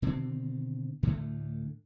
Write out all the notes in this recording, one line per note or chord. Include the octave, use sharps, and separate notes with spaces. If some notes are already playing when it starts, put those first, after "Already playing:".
B2 D3 D#3 C4
D2 A2 D3 A3